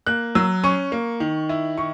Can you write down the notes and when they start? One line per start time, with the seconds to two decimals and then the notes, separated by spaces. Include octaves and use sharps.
0.07 A#3 F#6
0.35 F#3 E6
0.64 C#4 C#6
0.92 A#3
1.20 D#3
1.49 E4
1.78 D#3 C#6